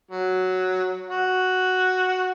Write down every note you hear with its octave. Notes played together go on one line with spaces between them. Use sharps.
F#3
F#4